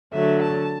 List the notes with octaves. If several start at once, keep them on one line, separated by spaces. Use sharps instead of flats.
D3 F#3 A3 E5
A5